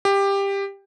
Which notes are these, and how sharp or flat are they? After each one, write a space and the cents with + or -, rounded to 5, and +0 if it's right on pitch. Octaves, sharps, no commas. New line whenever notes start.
G4 +15